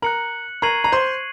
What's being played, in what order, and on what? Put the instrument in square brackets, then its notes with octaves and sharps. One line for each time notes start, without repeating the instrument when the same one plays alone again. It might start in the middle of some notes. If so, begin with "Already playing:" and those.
[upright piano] A#4 A#5 [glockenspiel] F#6 C#7 F#7
[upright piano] A#4 A#5 [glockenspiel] C#6 G#6 C7 D#7 F#7
[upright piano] A#5
C5 C6